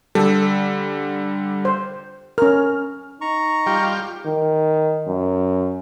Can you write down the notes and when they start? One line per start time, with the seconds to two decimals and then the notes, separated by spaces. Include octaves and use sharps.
0.15 D3 G3 A4
1.65 C5
2.38 C#4 A#4 F6
3.21 D#4 A#5 C#6
3.66 G3 F4 G4
4.26 D#3
5.08 F#2